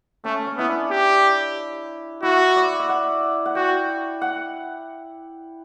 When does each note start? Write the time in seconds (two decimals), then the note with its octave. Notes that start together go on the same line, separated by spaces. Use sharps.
0.24 A3 C#4
0.47 C#4
0.57 B3 E4
0.68 D4
0.91 G4
2.23 E4 F#4
2.56 D5
2.79 E5
2.89 F#5
3.46 F#5
3.55 F#4 G5
4.21 F#5